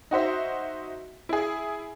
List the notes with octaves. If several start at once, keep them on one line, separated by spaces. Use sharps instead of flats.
D#4 F#4 C5 E5
E4 G#4